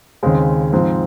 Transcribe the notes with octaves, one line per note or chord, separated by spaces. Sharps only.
D#2 C#3 G#3 C4
G#2 F3 C4